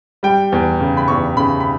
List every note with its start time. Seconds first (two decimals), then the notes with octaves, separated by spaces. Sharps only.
0.23 G3 G5
0.52 E2
0.81 C#3
0.97 B5
1.08 E2 C#6
1.37 C#3 B5
1.60 B5